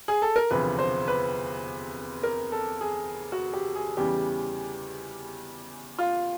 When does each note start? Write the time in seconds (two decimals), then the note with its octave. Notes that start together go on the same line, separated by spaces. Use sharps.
0.08 G#4
0.22 A4
0.36 A#4
0.51 E1 D2 C3 F3 B4
0.79 C5
1.08 B4
2.23 A#4
2.52 A4
2.81 G#4
3.32 F#4
3.53 G4
3.75 G#4
3.97 E2 C#3 E3 G3 G4
5.99 F4